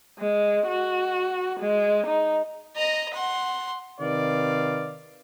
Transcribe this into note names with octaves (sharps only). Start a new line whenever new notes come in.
G#3
F#4
G#3
D#4
D#5 A#5
F#5 C6
C3 D#3 B4 D5 F5